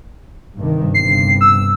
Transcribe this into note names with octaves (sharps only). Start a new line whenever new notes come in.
G2 C3 D#3
G1 G2 C3 C7
E6